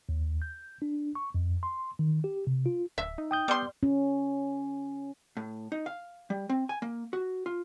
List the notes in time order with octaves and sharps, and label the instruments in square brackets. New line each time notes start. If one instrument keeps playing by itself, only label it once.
[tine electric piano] D#2
G6
D4
C#6
F2
C6
D#3
G4
C3
F4
[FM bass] D1 [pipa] E5
[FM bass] D#4
[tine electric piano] G5 D#6 G6
[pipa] G3 C6 [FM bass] B3
[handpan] C#4
[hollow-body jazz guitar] A2
D#4
F5
G3
C4
G#5
A#3
F#4
F4